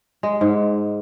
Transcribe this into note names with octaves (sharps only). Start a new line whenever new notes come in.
G#3
G#2